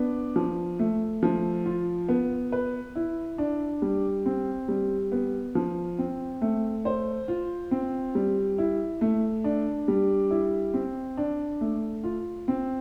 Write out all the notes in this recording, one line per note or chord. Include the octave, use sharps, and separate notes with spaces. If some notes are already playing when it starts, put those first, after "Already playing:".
Already playing: B3 D4
F3
A3
F3
F4
B3
B4
E4
D4
G3
C4
G3
B3
F3
C4
A3
C5
F4
C4
G3
E4
A3
D4
G3
E4
C4
D4
A3
F4
C4